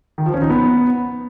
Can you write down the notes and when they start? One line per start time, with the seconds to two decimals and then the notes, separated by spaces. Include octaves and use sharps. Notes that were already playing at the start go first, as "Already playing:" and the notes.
0.18 D#3
0.26 F3
0.34 C#4
0.42 D#4
0.50 B3